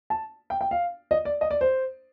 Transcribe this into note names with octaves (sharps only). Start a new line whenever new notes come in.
A5
G5
G5
F5
D#5
D5
D#5
D5
C5